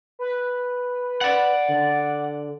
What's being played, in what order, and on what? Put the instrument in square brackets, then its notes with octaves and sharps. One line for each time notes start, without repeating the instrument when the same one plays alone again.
[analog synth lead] B4
[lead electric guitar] D5 F#5
[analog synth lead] D3